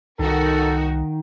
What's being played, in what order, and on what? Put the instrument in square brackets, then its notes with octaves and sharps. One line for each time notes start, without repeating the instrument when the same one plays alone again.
[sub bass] C2 [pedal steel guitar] D#3 [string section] D#4 F#4 A#4 [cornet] A4